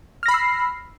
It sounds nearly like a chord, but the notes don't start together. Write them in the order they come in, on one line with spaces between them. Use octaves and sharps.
F6 A#6 B5 C7 E6